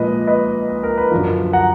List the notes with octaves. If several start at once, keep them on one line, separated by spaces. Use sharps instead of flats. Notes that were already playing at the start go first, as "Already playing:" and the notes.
Already playing: A#2 F3 G#3 B4 D#5
B4 D#5
B4
A#4
B4
F#2 D3 F3
F#5 A#5